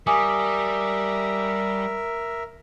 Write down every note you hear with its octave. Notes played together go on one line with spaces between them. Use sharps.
G3 A#4 E5 G#5 D6 D#6